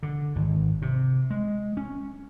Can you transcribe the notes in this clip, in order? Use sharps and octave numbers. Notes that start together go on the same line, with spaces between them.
D3
G#1
C3
G#3
C#4